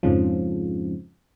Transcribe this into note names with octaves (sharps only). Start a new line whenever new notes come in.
F2 G#2 C#3 F3